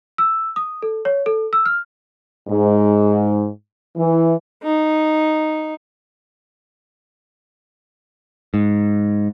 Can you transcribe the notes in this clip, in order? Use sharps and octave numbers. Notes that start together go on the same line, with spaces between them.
E6
D#6
A4
C#5
A4
E6
F6
G#2
E3
D#4
G#2